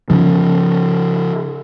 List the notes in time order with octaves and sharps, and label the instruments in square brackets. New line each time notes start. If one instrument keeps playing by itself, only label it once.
[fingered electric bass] C#3 F3